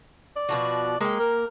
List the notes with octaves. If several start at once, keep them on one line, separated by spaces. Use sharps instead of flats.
D5
B2 F3 F#4
G#3 A#3 G5
A#4